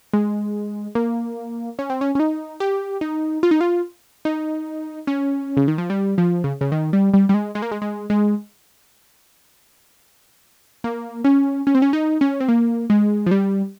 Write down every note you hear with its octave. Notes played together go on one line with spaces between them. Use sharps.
G#3
A#3
C#4
C4
C#4
C#4
D#4
G4
D#4
F4
D#4
F4
D#4
C#4
C#3
D#3
F3
G3
F3
C#3
C#3
D#3
G3
G3
G3
G#3
G#3
A#3
G#3
G#3
G#3
A#3
C#4
C#4
C4
C#4
D#4
C#4
C4
A#3
G#3
F3
G3